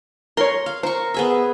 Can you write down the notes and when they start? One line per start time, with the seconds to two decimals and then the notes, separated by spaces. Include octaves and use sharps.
0.37 A#4 C#5 C6
0.66 F5
0.83 A#4 C5 C#6
1.14 B3 G#4 E5